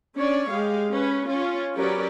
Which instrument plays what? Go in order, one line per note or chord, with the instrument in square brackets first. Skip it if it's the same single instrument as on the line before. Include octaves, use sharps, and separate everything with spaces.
[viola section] C#4 D4 C#5 D5
G#3 G4 F5
C#4 B4
C#4 F4
F#3 C#4 G4 A#4 B4 D5